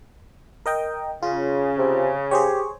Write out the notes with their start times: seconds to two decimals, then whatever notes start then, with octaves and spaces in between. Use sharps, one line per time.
0.66 A#4 D#5 G5
1.23 C#3 F4
1.78 C3
2.31 G4 G#4 C5 C#5